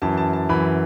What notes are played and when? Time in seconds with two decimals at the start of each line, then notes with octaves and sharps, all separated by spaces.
0.02 F#2 E3 A5
0.17 A5
0.33 A5
0.49 F#2 E3 B5